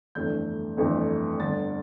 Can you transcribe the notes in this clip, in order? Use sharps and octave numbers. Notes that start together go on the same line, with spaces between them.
G1 F2 E3 A3 G6
G1 F2 E3 A3
G1 G2 D3 A6